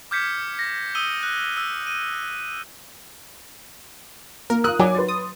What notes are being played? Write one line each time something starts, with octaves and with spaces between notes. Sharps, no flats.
D6 F6 G6 G#6 B6 C#7
A#6
D#6 E6 D#7 G7
F#6
E6
D#7
A#3 A#4
F4 A#4 D#6 F#6
F#3 D5 G#5 D6
B4 C6 A6
D#6